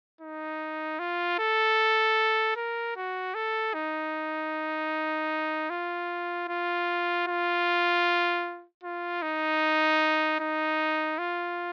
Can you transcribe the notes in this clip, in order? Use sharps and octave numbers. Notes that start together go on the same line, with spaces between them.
D#4
F4
A4
A#4
F#4
A4
D#4
F4
F4
F4
F4
D#4
D#4
F4